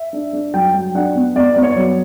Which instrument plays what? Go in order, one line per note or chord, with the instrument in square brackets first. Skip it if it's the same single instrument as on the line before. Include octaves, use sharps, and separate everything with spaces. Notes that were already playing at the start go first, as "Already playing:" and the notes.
Already playing: [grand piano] E5
D4
D4
F#3 G5
F#3
D4 F#5
B3
B3 D5
B3 D5
C#5
F#3